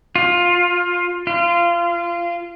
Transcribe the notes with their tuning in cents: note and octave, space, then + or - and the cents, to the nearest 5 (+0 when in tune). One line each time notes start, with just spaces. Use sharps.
F4 +15
F4 -20